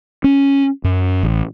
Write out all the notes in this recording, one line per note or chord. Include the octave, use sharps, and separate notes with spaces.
C#4
F#2
A1